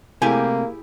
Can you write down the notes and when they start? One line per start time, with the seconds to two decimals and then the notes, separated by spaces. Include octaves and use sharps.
0.22 C3 A3 A#3 E4 G4 G#4 G#5